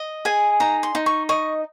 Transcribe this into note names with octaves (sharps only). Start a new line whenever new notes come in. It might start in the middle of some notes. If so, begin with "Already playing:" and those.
Already playing: D#5
G#4 G#5
D#4 A#5
C6
D#4
C#6
D#5 C#6